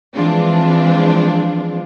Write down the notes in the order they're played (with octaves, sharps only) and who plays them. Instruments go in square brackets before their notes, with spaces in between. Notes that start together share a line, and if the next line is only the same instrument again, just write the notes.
[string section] E3 F3 G#3 C4 D4 F4